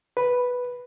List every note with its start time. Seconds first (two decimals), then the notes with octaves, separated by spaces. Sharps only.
0.17 B4